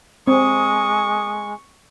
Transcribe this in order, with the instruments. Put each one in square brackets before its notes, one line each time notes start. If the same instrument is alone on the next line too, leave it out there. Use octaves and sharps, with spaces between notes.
[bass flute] G#3 [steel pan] C4 [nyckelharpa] C#6 [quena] D#6